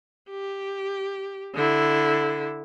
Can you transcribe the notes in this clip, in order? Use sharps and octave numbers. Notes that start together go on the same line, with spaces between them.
G4
D3 E4